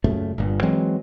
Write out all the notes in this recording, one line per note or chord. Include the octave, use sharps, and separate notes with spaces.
F#2 A#2 C#3 A3
G1 G2 A#2
E3 F#3 G#3 C4